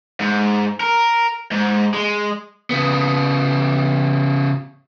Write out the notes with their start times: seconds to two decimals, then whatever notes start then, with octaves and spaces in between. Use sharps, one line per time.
0.20 G#2
0.80 A#4
1.51 G#2
1.94 G#3
2.70 C#3 B3